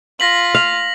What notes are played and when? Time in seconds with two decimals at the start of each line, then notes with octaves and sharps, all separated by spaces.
0.20 F4 A#6 B6 F#7
0.55 F5